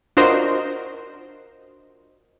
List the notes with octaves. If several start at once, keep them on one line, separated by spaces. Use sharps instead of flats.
D4 F4 F#4 A#4 C5 D#5